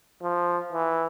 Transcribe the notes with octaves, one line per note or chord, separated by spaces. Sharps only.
F3
E3